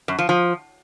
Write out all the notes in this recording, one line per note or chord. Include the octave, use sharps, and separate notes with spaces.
F#2
F3
F3